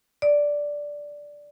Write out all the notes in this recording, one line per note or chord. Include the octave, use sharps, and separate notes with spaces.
D5